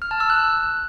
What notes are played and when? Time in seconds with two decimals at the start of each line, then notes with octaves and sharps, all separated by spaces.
0.02 F6
0.11 A5
0.20 E6
0.30 F#6